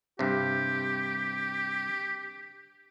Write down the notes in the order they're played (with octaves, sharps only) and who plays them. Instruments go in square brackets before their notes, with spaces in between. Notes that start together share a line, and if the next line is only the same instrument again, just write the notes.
[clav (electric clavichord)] G2 C3 [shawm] G4